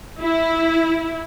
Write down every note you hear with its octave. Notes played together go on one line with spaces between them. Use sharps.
E4